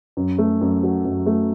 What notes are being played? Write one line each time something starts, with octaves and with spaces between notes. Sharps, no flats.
F#2
A3
F#2
F#3
F#2
A3